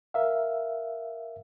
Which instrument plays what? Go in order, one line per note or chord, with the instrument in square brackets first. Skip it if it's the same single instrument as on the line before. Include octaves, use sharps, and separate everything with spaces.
[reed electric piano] A#4 E5 F5